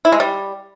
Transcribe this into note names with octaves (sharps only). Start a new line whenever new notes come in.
E4
G#3
G3